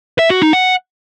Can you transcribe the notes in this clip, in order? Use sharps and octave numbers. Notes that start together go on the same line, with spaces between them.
E5
F#4
D#4
F#5